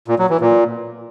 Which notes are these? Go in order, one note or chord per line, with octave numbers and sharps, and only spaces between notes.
A#2
F#3
E3
A#2